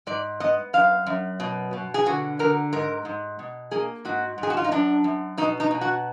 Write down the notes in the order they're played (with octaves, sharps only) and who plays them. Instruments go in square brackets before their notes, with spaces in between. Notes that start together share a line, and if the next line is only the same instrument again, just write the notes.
[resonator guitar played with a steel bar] G#2 D5
B3 D#5
F#2 F5
F#2
B2
B2
G#4
D3 F#4
D3 A#4
G#2 A#4
G#2
B2
A#3 G#4
G#2 F#4
G#2
G#4
F#4
F4
D#4
F#2 D4
F#2
B2 D#4
D#4
B2
F#4